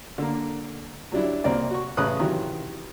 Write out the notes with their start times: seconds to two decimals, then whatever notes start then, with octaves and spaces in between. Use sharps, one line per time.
0.18 D3 A#3
1.12 F#3 G3 D4 E4
1.44 C2 A#3 C4 D5
1.71 F#4 C#6
1.97 A1 C#3 B4 D#6 F#6
2.19 C3 D#3 E3 F#3